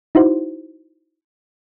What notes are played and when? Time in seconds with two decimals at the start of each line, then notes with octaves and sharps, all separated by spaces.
0.15 D#4 E4 F#4 C5